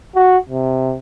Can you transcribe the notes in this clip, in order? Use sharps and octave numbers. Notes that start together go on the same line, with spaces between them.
F#4
C3